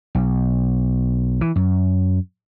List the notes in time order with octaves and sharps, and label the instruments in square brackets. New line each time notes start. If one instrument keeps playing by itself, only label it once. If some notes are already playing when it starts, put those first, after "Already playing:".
[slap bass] B1
E3
F#2